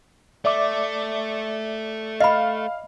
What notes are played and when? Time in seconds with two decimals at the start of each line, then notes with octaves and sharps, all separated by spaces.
0.45 A3 D5 E5 D6
2.20 D#5 F5 B5